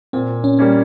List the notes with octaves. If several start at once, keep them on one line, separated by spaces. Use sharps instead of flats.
A#2 C4
C#4
G3 A#3 C#4